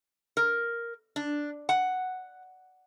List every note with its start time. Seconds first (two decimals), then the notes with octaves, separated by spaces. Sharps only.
0.37 A#4
1.16 D4
1.69 F#5